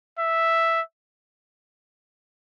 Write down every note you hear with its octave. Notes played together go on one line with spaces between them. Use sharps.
E5